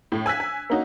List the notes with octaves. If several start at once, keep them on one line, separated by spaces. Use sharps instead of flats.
A2
G#5 E6 F#6 B6
G#5
A#3 C#4 D#4 F#4